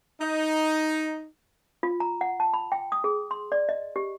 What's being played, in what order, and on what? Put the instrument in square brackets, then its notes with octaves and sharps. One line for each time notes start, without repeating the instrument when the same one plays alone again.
[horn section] D#4
[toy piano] F4
A#5
F#5
A5
B5
G5
D#6
G#4
C6
D5
D#5
G4